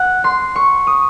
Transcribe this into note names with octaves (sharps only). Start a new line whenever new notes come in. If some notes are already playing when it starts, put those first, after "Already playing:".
Already playing: F#5
C6
C#6
D#6